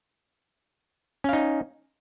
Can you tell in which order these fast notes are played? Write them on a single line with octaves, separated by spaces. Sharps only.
C#4 F5 D#4